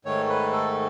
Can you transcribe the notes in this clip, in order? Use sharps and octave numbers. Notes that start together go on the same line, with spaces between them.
G#2 D#3 A3 C#5
B4
A4